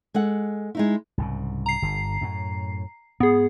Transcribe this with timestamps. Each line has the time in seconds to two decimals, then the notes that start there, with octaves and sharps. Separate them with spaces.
0.14 G#3 A4 F#5
0.75 G#3 D#4 E4
1.18 C2 G#2 C#3
1.66 A#5 C7
1.82 G1 D3
2.21 F#2 A2
3.20 G#2 B3 G#4